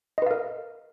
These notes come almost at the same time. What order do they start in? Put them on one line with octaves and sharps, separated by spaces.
D#5 B4 F5 A#4